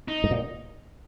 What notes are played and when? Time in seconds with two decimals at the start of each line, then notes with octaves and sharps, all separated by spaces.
0.08 D#4
0.24 G#2
0.31 A#2